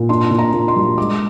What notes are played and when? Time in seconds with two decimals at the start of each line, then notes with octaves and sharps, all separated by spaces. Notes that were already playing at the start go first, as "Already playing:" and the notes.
Already playing: A#2
0.09 D4 C6
0.31 A#2
0.39 A#5
0.54 A#2
0.68 C6
0.76 G3
0.98 G#3 D6